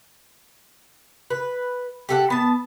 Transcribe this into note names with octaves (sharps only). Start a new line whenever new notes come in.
B4
G4 A4 F#5
B3 A5